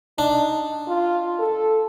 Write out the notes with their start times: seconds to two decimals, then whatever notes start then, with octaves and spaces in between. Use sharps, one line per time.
0.18 D4 D#4
0.88 F4
1.40 A4